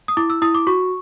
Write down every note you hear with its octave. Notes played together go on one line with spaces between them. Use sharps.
D#6
E4 D6
E6
E4 D#6
D6
F#4 C#6